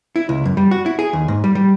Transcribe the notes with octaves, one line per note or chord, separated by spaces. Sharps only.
E4
C#2
F#2
G3
F#4
E4
G#4
D#2
G#2
G3
G3